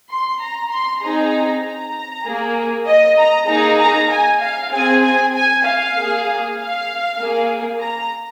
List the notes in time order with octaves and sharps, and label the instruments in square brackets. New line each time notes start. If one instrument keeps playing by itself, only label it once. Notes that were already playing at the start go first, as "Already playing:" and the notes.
[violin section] C6
A#5
C6
C4 D#4 G#4 A#5
A#5
A#3 G#4
D#5
A#5
A#3 D#4 G#4 A#5
A#5
G#5
F5
C4 G#4 G#5
G#5
G#5
F5
A#3 G#4
F5
A#3 G#4
A#5